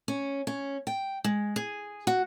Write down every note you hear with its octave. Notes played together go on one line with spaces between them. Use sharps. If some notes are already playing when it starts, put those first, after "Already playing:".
C#4
C#4
G5
G#3
G#4
F#4